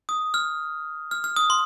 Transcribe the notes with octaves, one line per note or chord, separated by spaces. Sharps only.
D#6
F6
F6
F6
D#6
C6